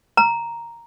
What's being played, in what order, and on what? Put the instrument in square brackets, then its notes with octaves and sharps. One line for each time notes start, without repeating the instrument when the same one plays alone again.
[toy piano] A#5